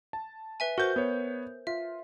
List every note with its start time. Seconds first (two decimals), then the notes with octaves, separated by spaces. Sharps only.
0.13 A5
0.60 B4 E5 G#5
0.78 F#4 A#4 C5 G6
0.96 B3 C#5
1.67 F4 E5